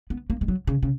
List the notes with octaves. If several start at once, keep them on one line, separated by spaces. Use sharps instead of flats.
B3
A#3
G#3
F#3
C#3
C#3